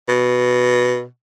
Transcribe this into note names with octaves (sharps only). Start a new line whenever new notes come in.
B2